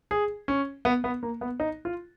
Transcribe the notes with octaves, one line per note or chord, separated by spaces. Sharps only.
G#4
C#4
B3
B3
A#3
B3
D#4
F4